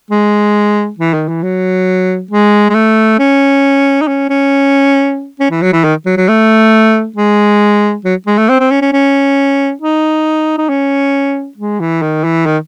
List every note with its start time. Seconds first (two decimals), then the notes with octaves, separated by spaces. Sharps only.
0.11 G#3
0.99 E3
1.14 D#3
1.28 E3
1.43 F#3
2.31 G#3
2.69 G#3
2.75 A3
3.19 C#4
4.01 D#4
4.08 C#4
4.29 C#4
5.40 C#4
5.51 E3
5.62 F#3
5.73 E3
5.84 D#3
6.06 F#3
6.17 F#3
6.28 A3
7.16 G#3
8.04 F#3
8.26 G#3
8.38 A3
8.49 C4
8.60 C4
8.71 C#4
8.82 C#4
8.92 C#4
9.82 D#4
10.58 D#4
10.69 C#4
11.57 G#3
11.80 E3
12.02 D#3
12.24 E3
12.46 D#3